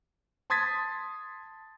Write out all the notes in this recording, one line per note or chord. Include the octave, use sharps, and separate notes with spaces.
A5 C6 D#6 G#6 A6 B6